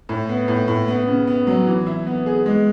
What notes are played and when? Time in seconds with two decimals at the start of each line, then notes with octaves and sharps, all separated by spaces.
0.09 A2
0.29 B3
0.48 A2
0.68 A2
0.88 B3
1.08 C#3
1.27 B3
1.47 F#3
1.67 E3
1.87 E4
2.06 B3
2.26 G#4
2.46 G#3